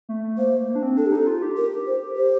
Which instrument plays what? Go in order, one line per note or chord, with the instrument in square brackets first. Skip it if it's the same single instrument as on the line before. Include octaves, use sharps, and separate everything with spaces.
[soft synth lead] A3
A3
[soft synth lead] A#3 [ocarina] C5
[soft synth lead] A#3
D4
C4
[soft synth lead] D4 [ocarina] A4
[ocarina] G4
[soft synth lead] D#4 [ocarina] A4
[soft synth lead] F4
G4
[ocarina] A#4
C5
C5